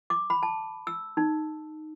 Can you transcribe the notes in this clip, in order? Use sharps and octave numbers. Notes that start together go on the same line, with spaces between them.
D6
B5
A5
E6
D#4